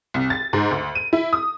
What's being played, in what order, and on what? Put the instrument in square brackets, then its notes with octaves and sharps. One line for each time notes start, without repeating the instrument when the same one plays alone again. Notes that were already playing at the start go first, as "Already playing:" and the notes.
[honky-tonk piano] C2
A6
G#2
D2
D#7
E4
D#6